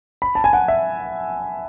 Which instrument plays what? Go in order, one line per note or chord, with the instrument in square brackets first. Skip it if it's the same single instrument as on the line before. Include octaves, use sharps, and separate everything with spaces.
[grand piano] B5
A5
G#5
F#5
E5